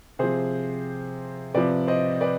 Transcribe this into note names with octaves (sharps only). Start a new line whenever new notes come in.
C3 F3 G#4 C5
C3 F3 B4 D5
C5 D#5
B4 D5